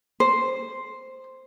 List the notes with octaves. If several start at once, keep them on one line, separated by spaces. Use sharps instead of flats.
C5